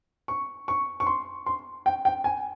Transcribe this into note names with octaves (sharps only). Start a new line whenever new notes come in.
C#6
C#6
C#6
C6
C6
G5
G5
G#5